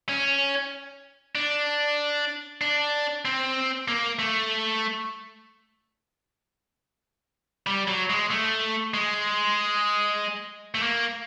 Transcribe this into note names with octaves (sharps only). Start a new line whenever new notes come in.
C#4
D4
D4
C4
A#3
A3
G3
F#3
G#3
A3
G#3
A3
A#3